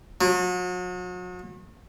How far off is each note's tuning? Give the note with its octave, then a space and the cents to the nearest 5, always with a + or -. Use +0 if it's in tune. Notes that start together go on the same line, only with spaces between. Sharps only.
F#3 -40